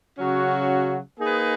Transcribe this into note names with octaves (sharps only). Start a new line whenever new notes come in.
C#3 F#3 C#4 F#4
A#3 D#4 G#4 B4